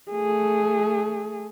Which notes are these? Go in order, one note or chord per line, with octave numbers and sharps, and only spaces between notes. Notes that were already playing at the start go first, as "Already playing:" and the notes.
A3 G#4